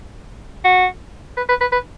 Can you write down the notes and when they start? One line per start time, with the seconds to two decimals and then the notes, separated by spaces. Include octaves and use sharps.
0.64 F#4
1.37 B4
1.49 B4
1.61 B4
1.72 B4